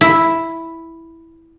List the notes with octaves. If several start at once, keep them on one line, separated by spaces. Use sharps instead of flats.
E4